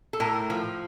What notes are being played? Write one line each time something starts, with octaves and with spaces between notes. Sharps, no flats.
A4
A2 A#4
F3